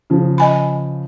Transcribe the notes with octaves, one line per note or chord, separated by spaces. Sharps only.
C#3 F3
D#5 G#5 B5